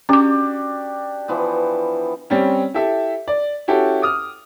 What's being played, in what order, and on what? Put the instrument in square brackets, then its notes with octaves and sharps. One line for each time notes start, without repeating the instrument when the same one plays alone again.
[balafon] C#4 D6 [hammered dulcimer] D4 F#4 G4
[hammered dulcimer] E3 F3 B3
[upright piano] G3 C4 C#4
E4 G4 A4 E5
D5
C#4 E4 F#4 G4 A4
D6 D#6 F6